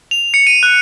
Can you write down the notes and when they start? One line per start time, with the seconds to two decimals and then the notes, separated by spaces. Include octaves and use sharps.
0.11 F7
0.34 C#7
0.47 D#7
0.63 F#6